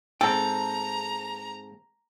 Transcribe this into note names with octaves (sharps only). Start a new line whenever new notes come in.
G#2 C4 A4 G5 A#5